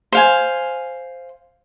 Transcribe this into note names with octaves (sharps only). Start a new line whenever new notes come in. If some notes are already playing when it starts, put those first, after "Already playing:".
C5 F5 G#5